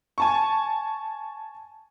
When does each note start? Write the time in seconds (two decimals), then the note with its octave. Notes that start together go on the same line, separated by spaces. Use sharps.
0.18 G#5 A5 C#6